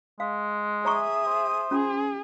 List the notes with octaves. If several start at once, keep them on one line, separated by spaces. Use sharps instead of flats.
G#3 F5
G#4 C#5 E5 A#5 C#6 D#6
C5
C#4 F4 G#4